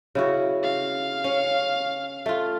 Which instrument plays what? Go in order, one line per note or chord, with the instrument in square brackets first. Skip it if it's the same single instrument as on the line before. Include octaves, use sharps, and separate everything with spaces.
[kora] C#3 E4 F#4
[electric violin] F5
[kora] C#4
A3 F4